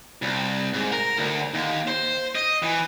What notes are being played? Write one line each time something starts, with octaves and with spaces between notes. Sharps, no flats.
C2
G#2
A#4
D2
D#2
C5
D#5
E3